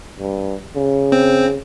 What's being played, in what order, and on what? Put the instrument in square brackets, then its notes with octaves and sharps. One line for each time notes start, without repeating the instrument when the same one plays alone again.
[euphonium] G2
C#3
[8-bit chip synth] C4